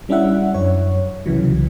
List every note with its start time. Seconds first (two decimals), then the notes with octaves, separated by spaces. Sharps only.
0.09 G3 C#4 D4 E4 E5 F#5
0.55 F#2 C#5
1.26 C2 C#3 E3 F#3